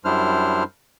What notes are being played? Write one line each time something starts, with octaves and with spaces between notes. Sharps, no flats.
F#2 G3 D4 E4 C5 F6